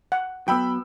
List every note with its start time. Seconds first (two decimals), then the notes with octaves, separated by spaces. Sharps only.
0.12 F#5
0.48 F#3 B3 G5 B5 E6